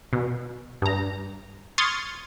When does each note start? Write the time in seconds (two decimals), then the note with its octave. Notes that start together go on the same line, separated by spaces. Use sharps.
0.13 B2
0.82 G2 A#5
1.78 C6 C#6 D#6 F6 G#6 A6